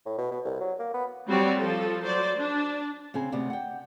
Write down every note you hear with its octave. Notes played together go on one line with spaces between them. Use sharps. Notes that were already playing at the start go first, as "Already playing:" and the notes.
A2
B2
B2
C2
F#3
A#3
B3
F#3 G3 C4 F#4 C#5 D5
F3 A4
F#3 C5 D5
D4
C#3 C4 G#4 G#5
D2 C3 B3 D5
F#5 G5